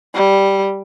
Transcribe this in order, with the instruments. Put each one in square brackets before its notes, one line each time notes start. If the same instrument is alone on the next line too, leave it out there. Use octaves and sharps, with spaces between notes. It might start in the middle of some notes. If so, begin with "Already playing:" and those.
[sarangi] G3